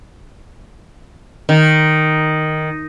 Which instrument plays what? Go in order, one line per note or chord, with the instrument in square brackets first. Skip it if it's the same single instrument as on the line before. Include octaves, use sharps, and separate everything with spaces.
[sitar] D#3